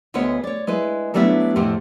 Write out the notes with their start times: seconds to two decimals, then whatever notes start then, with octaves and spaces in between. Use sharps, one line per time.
0.14 D2 G#3 B3 C#5 F#5
0.44 C#5 D5
0.67 G#3 E4 B4
1.14 F#3 G3 A3 B3 D4 E4
1.56 F2 A2 C3 G4 F#5